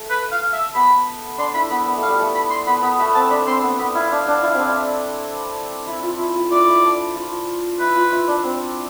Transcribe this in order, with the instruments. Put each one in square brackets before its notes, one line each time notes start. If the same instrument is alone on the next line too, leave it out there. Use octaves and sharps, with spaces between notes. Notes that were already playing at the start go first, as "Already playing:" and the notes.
Already playing: [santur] A3
[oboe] B4
F5
E5
[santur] B3 [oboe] B5
[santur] D4 [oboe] C6
[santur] E4 [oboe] B5
[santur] B3 [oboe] B5
[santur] B3
A3
[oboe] F5
[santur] G3
A3
[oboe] B5
C6
[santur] B3 [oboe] B5
[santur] B3 [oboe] B5
[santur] A3 [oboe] B5
[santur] C4 [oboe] A5
[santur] D4 [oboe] B5
[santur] C4 [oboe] C6
[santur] B3
[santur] B3 [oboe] B5
[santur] E4 [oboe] F5
[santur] D4
D4
E4
C4 D4
E4
F4
E4
F4
[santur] E4 [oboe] D5
[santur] E4
D4
F4
[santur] E4 [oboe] B4
[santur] F4
E4
D4
C4